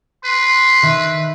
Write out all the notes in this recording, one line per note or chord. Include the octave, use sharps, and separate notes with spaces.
B4 C6
D#3 E5